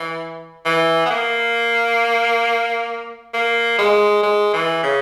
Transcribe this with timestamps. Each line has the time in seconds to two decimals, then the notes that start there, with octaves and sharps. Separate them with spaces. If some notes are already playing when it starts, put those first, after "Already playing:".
Already playing: E3
0.66 E3
1.06 B3
1.10 A#3
3.34 A#3
3.78 G#3
4.23 G#3
4.53 E3
4.83 C#3